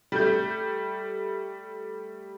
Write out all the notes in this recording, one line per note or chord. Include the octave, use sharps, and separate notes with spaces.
G3 A3 G6